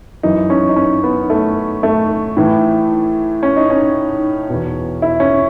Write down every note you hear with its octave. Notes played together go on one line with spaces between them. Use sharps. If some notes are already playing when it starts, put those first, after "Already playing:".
F#2 E3 D#4
C#4
D#4
C#4
B3
A3
A3
A2 E3
C#4
D#4
C#4
E2 B2
E4
C#4